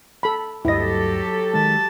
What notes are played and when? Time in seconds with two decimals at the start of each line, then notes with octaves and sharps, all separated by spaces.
0.23 A4 B5
0.65 D2 G2 F#3 E4 G4 A4 D#5 A#6
1.54 D#3 G#3 A5